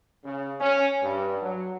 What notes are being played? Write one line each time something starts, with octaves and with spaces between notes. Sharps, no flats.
C#3
C#4
G2
F#3